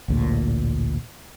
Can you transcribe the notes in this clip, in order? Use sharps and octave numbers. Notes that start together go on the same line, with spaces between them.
A1 D2 A#2